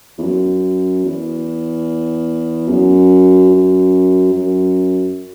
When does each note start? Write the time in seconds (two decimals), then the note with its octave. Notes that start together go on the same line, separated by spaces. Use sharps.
0.18 E2
0.22 F#2
1.05 E2
2.68 F#2
3.50 F#2
4.32 F#2